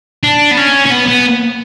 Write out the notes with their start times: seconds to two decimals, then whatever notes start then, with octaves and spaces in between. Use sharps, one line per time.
0.23 D4
0.51 B3
0.57 C#4
0.86 C#4
0.91 B3
1.08 B3